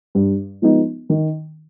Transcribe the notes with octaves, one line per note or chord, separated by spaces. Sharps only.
G2
F3 G#3 B3 D#4
D#3